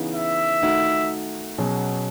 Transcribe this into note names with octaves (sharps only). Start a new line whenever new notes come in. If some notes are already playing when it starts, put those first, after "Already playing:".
Already playing: C#3 E3 B3 D#4
E5
D#3 A3 D#4 F#4
B2 F#3 C#4 G#4